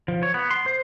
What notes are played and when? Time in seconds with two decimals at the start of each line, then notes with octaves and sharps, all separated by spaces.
0.08 F3
0.23 C#5
0.34 B3
0.51 C6
0.66 C5